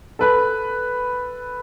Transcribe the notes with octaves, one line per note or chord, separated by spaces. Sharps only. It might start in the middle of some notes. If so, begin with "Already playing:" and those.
A4 B4 B5